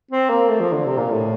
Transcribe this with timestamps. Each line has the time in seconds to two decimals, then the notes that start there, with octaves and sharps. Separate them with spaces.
0.11 C4
0.30 A#3
0.49 A3
0.60 F3
0.73 D3
0.86 C3
0.97 A#2
1.10 A2